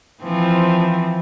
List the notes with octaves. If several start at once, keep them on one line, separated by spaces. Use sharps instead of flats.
E3 F3 C4